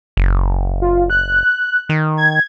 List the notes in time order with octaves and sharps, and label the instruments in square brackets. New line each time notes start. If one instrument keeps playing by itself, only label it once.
[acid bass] F#1
[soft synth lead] F4
F#6
[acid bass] D#3
[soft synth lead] G#6